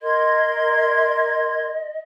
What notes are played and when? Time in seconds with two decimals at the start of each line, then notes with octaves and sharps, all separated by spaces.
0.01 A#4 D#5 C6 G#6